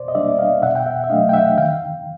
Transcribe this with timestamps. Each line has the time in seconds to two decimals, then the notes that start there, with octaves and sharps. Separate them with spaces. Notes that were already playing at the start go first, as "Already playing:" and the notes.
Already playing: B2 C5 D5
0.08 D#5
0.15 G3 A#3 D4 D5 E5
0.39 D#5 F5
0.62 B2 E5 F#5
0.76 G5
0.86 E5 F#5
1.04 E5
1.10 F#3 A3 D4 D#5 F5
1.29 G5
1.33 E5 F#5
1.57 D#3 F5 G5